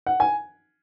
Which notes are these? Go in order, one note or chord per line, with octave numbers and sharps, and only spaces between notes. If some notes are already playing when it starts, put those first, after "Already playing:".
F#5
G#5